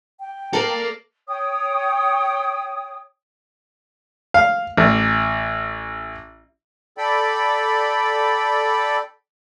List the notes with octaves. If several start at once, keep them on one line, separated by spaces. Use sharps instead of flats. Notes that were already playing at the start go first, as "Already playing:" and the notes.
G5
A#3 A4 D5
C#5 G5 D#6
F5
A1
A4 D5 G5 B5